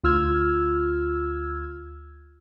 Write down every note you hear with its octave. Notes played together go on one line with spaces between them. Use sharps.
D2 F4 E6 F6 G#6